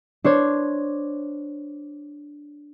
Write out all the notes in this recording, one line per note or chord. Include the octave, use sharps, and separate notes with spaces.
D4 C5 C#5